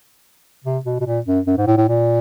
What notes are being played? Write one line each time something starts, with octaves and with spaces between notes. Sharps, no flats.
C3
B2
B2
A#2
F#2
F#2
G#2
A2
A2
A#2